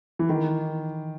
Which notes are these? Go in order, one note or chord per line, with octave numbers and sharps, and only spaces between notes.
E3
D#3